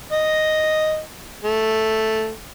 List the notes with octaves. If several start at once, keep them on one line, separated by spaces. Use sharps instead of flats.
D#5
A3